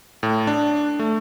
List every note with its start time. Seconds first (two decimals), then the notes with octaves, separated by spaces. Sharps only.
0.23 A2
0.47 D4
0.99 A3